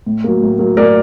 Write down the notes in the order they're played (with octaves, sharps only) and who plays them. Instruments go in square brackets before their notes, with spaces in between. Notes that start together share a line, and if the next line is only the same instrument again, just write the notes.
[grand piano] A2
F#3 A#3
A2
F#3 A#3
A2 A#4 D5